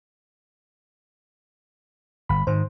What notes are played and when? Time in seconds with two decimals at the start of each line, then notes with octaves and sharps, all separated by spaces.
2.29 G1 B5
2.47 G#2 D#3 C5